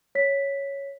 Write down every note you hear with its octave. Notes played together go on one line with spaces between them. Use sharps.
C#5 B6